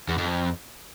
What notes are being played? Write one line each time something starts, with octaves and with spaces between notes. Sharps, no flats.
E2
F2